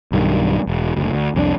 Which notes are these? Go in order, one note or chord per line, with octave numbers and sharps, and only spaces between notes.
B1 G2 D#3
E1
F#1 D2
D2
C2 F2 F3 D4